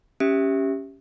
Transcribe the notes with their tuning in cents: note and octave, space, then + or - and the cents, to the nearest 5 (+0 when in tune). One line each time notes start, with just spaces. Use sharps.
C#4 +0 G4 +0 E5 +0